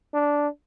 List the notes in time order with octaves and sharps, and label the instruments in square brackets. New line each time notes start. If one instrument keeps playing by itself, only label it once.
[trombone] D4